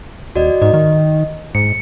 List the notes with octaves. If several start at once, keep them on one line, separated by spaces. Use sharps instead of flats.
D#1 F#4 D5 D#5
G#2 D#5
D#3
G#2 C#7